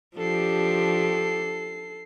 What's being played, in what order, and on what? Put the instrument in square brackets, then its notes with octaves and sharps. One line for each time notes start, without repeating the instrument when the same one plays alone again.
[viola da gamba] F3 D4 G4 [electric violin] A4 C7